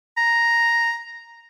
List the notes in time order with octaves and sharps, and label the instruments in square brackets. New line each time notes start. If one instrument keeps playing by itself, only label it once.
[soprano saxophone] A#5